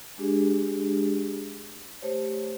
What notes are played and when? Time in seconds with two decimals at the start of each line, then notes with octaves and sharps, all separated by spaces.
0.18 G#3 D4 G4 G#4
2.02 A3 G4 C5 C#5